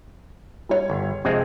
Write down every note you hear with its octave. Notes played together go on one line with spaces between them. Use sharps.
G3 C#5
G1
F2 C3 G#3 C4